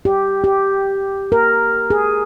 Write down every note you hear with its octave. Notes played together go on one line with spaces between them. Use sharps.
G4
G4
A#4
G#4